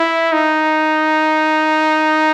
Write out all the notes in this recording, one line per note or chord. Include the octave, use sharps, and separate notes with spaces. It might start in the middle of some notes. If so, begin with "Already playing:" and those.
Already playing: E4
D#4